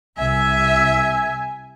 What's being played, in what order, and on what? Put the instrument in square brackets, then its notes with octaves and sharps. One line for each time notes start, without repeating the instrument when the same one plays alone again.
[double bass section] C2 [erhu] E5 [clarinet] G#5